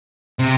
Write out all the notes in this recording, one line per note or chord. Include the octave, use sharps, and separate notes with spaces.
C3